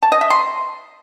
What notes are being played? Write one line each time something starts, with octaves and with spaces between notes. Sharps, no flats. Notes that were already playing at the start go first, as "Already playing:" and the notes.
A5
D#5
E5
C6